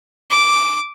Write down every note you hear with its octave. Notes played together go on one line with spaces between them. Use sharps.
D6